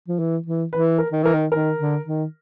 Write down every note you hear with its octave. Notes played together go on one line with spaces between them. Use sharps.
F3
E3
E3
E3 B4
A#4
D#3
E3 A#4
D#3
D#3 A#4
D3
D#3